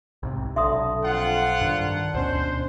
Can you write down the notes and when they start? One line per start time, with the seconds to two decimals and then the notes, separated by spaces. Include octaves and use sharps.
0.23 C2 G#2 C3
0.56 B1 D3 E5 C6 D#6
1.04 F2 F4 F#5
1.61 G2 D#3 D4
2.14 D2 B2 C#4 C5